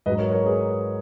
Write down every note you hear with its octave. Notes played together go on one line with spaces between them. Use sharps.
G#2 F#3 B4 D#5
A#4 C#5
A#4 C#5
G#4 B4